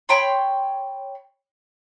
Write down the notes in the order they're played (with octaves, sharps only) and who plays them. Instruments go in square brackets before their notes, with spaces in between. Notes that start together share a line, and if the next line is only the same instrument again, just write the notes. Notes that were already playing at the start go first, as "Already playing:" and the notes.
[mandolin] C#5 G5 B5 C6